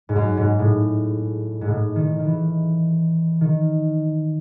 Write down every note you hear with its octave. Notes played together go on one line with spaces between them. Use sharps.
G#2
F#2
G#2
A2
G#2
A2
D#3
D#3
E3
D#3